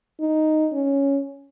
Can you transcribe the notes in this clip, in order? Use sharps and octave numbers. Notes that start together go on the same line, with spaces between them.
D#4
C#4